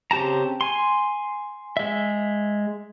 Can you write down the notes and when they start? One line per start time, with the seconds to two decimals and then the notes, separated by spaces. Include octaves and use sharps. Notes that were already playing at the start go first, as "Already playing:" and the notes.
0.11 C#3 C4 G4 A5 A#5
0.61 G#5 C6
1.77 G#3 E5